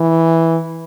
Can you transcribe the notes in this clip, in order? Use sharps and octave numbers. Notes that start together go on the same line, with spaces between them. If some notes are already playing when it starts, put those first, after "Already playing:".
Already playing: E3